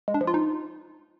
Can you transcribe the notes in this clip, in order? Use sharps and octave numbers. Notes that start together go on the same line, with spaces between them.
G#3
D4
F3
F4
D#4